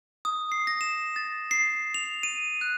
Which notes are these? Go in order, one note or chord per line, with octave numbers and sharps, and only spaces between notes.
D#6
C7
A#6
E7
A6
C7
F7
D#7
F#6